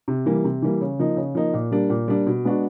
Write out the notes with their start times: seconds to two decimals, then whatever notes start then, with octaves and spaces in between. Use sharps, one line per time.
0.08 C3
0.26 E3 G3 A#3
0.44 C3
0.62 E3 G3 A#3
0.81 C#3
0.99 F3 A#3 D#4
1.17 C#3
1.35 F3 A#3 D#4
1.54 A#2
1.71 G3 A#3 D4
1.90 A#2
2.08 G3 A#3 D4
2.27 B2
2.45 G#3 B3 D4 F#4